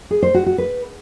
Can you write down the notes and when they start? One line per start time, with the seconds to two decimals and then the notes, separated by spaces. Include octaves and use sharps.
0.11 G#4
0.23 C5
0.34 F#4
0.46 F#4
0.58 B4